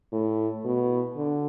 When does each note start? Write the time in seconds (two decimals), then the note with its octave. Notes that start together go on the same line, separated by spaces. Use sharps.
0.12 A2
0.65 B2
1.16 D3